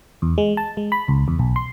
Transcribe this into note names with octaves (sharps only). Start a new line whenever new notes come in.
E2
G#3
A5
G#3
B5
C#2
E2
B1
C6